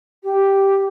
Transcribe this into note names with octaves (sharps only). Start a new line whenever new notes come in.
G4